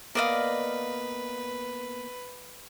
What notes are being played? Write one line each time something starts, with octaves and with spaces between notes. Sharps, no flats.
A#3 B3 A#4 B4 D5 D#5 F5